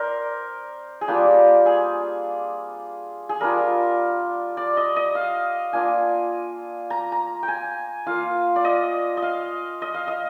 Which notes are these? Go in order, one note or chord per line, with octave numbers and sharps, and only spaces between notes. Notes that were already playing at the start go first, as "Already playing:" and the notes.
Already playing: C4 A#4 C5 D5
G#4
G3 A#3 D4 F4 G4
G#4
G#4
G3 D4 F4 A#4
D5
D#5
D#5
F5
A#3 D4 F4 G#5
A#5
A#5
G5
G#5
A#3 F4 F5
D5
D#5
D#5
F5
D#5
F5
D#5